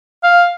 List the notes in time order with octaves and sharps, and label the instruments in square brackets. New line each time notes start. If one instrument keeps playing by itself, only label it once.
[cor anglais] F5